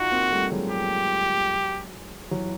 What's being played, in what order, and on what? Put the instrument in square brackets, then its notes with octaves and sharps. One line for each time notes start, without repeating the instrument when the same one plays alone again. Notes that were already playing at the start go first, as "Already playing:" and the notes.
Already playing: [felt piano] D#4 F4 [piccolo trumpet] F#4
[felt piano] A#3 C4
G3 A3
F#3 G#3
[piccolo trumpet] G4
[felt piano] E3 F#3